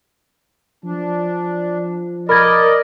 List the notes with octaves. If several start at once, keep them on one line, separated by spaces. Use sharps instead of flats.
F3 D4
A#4 D5 D#5 B5 G#6